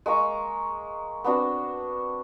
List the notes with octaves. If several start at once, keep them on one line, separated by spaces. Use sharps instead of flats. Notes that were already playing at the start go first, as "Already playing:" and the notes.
G#3 A#3 A#5 C#6
B3 C4 D4 F#4